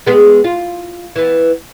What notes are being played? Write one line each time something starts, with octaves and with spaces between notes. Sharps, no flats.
G#3 B3 G#4
F4
E3 B3